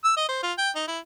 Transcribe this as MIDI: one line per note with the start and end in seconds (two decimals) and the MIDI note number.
0.04 0.13 88
0.17 0.25 75
0.29 0.41 72
0.43 0.52 65
0.58 0.70 79
0.76 0.83 63
0.87 0.99 64